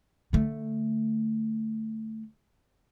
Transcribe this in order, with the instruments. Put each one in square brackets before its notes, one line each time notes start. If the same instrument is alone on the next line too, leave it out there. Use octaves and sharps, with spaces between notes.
[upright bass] D3 A3